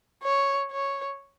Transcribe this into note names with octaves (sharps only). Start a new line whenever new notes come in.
C#5
C#5